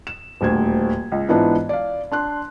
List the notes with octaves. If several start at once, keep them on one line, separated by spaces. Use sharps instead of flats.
E7
D#1 D2 G#6
C#2
G#2 E3 B3 D4 F4
D5 F5
D4 C6 F#6